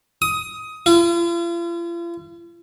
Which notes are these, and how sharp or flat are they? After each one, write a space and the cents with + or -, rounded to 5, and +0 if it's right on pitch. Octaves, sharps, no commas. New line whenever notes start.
D#6 +15
F4 -45